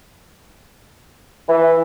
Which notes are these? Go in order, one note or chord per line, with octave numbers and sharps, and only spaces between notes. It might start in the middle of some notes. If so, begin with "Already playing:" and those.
E3